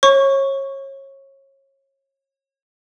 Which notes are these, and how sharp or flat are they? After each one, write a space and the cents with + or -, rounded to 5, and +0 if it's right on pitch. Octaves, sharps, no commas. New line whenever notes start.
C#5 -30 C#6 +5